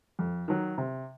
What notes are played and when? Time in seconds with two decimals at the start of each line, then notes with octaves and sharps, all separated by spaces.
0.19 F2
0.48 D#3 F#3
0.78 C3